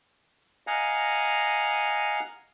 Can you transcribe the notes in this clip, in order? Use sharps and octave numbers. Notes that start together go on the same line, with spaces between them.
D#5 F5 F#5 G#5 A#5